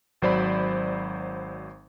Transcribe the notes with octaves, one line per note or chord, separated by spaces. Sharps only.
G#1 F#3 C5 D5 B5